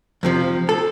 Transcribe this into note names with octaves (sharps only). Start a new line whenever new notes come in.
F2 C3 F3
A4